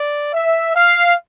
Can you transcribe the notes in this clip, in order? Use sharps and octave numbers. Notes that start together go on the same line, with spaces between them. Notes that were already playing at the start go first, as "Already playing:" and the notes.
Already playing: D5
E5
F5